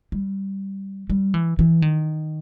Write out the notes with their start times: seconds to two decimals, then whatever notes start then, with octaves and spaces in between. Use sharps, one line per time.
0.12 G3
1.10 G3
1.34 E3
1.59 E3
1.82 D#3